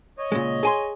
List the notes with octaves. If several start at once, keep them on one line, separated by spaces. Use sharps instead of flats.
C#5 D#5
A#2 C#3 G#3
G#4 G#5 C6